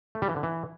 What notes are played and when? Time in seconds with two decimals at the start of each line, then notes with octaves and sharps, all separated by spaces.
0.15 A3
0.22 G3
0.29 E3
0.36 D3
0.43 E3